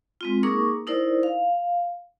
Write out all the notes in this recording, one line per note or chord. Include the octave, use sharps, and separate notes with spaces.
G#3 C4 F4
A#3 D#4 G#4 A#4 C#6 D6
D#4 E4 A#4 C5 D5
F5